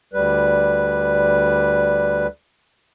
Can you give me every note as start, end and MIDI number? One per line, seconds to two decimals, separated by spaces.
0.13 2.27 38
0.13 2.27 55
0.13 2.27 71